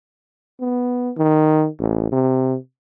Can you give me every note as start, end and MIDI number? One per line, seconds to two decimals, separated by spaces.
0.60 1.10 59
1.17 1.67 51
1.80 2.07 33
2.12 2.56 48